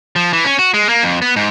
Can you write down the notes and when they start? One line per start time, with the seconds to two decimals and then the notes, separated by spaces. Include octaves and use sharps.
0.16 F3
0.33 E3
0.45 C#4
0.59 F#4
0.74 G#3
0.89 A#3
1.03 F2
1.22 B3
1.36 G#2